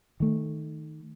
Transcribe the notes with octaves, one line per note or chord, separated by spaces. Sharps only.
D#3 A3